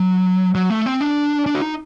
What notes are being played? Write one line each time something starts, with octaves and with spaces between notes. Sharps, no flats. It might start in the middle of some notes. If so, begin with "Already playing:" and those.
Already playing: F#3
F#3
A3
C4
D4
D4
F#4
D#4